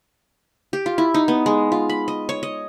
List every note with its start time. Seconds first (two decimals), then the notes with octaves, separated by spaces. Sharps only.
0.73 G4
0.86 F4
0.98 E4
1.14 D#4
1.28 B3
1.46 G#3
1.72 F4
1.90 B5
2.08 D#5
2.29 C#5
2.43 D#5